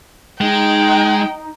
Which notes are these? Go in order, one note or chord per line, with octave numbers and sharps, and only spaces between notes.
G#3 D#4 G5